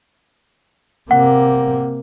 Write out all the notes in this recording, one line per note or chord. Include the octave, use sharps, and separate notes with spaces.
C3 A#3 F#5